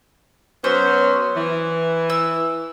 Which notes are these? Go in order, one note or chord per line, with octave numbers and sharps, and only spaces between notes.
F#3 B3 C#4 C5
E3
E6